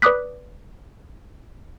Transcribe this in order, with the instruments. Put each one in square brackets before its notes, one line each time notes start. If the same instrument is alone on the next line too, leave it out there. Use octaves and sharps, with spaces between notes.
[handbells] B4 D5 D6 D#6 F#6 B6